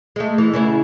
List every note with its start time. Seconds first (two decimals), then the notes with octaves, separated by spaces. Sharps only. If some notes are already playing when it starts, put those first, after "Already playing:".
0.16 G#3 A3
0.38 E3
0.53 C#3 B3 E4